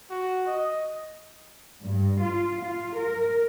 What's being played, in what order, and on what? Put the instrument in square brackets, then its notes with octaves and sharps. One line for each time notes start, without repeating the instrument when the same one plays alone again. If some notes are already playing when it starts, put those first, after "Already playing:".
[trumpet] F#4
D#5
[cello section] G2
F4
F4
A#4